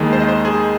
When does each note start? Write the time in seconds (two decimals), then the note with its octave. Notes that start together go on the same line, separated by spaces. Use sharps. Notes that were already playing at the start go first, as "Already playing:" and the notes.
Already playing: D#2 D#3 G#3
0.13 C5
0.20 D#5
0.28 C5
0.45 G#4